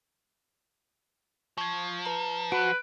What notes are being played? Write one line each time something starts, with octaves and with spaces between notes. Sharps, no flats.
F3 C#6 G#6
B4 A#5
F#4 B4 D7